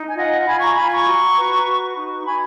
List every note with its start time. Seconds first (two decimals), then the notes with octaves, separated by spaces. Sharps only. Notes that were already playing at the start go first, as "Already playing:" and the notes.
Already playing: D#4
0.09 G#5
0.16 F4 D#5 F#5
0.46 F4 G#5 B5
0.61 A#5 C#6
0.76 F4 G#5 B5
0.92 A#5 C#6
1.06 F#4
1.36 B4
1.65 F#4
1.96 D#4
2.20 C#6
2.25 D#4 G#5 B5